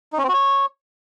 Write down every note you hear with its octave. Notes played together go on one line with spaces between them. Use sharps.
D#4
C#4
C4
F#4
C#5